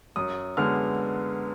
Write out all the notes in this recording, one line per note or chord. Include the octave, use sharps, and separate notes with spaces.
F#2 D#6
D3 G#3 B3 F6